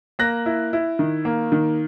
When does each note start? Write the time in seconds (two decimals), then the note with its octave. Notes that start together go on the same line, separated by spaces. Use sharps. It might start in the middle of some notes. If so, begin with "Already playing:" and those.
0.19 A#3 F#6 A#6
0.46 E4
0.73 E4
0.99 D#3
1.25 A#3
1.52 D#3